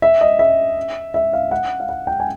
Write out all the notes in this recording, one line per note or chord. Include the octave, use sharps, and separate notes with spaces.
E5
D#5
E5
E5
F5
F#5
F5
F#5
G5
G#5